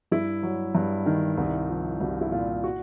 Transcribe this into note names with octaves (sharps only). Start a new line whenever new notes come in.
G2 E4
F#3
G2
D#3
C2
F3
C2 F#4
F4
E4
A#2 F4
F#4